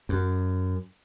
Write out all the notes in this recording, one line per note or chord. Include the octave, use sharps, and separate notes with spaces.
F#2